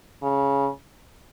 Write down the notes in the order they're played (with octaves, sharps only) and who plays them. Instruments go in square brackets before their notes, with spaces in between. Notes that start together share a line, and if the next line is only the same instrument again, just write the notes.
[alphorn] C#3